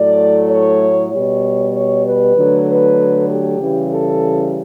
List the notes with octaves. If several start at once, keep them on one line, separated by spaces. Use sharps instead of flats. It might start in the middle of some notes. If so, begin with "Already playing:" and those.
Already playing: A2 F#3 A3 D5
C#5
B2 G3 C#5
C#5
B4
D3 F#3 A3
B4
G4
C#3 E3 G3
A4